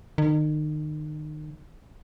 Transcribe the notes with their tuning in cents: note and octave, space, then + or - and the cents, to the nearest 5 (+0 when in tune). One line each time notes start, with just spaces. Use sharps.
D#3 -35